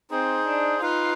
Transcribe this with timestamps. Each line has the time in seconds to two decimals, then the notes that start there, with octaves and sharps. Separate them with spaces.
0.10 C4 D#4 G#4 C5
0.46 D4
0.81 D#4 F4 B4 F5